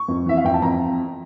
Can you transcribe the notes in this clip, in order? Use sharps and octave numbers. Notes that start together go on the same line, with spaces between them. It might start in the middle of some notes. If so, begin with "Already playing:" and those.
Already playing: C#6
F2
E3 E5
F5
F2 G5
A5
F2 A#5